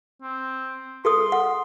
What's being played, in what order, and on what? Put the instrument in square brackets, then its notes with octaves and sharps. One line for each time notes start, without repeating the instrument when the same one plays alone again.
[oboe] C4
[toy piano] G#4 A4 D#6 [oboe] C6
[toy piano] F#5